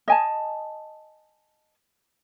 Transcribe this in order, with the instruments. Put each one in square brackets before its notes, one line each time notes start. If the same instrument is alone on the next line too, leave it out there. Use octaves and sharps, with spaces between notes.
[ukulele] D#5 G#5 A5